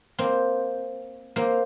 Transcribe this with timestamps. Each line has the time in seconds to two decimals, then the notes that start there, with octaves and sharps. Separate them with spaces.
0.18 A#3 C4
1.36 A#3 C4